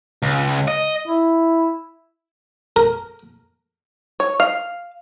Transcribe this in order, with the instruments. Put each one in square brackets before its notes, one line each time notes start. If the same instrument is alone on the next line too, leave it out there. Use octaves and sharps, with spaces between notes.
[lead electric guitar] C#2
D#5
[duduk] E4
[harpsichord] A#4
[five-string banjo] C#5
F5